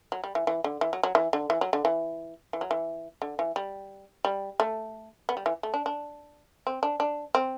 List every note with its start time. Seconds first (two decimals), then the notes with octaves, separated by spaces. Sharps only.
0.12 F#3
0.24 G3
0.35 E3
0.47 E3
0.64 D3
0.81 E3
0.93 F#3
1.03 F#3
1.15 E3
1.33 D3
1.50 E3
1.61 F#3
1.73 D3
1.85 E3
2.53 E3
2.61 F#3
2.71 E3
3.22 D3
3.39 E3
3.56 G3
4.25 G3
4.60 A3
5.29 B3
5.37 G3
5.46 E3
5.63 A3
5.74 D4
5.86 D4
6.67 C4
6.83 D4
7.00 D4
7.35 C4